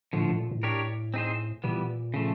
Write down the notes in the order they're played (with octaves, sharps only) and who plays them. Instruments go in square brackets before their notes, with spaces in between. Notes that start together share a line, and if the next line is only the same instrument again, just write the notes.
[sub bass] A2 [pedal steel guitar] D3 F3 A3
[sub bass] A2
A#2
A2
[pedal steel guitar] D4 G4 A#4 C#5
C4 D#4 G#4 C5
[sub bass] A#2 [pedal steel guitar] E3 G3 B3
[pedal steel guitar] C#3 F3 A3